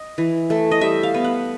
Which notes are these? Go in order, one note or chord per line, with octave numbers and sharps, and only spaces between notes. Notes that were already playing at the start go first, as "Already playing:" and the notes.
Already playing: D#5
E3
A3
D#5
G3 E5
F5
B3
F#5